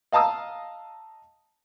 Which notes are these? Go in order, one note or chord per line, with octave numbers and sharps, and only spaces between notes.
D#5 F5 A5 A#5 D#6 E6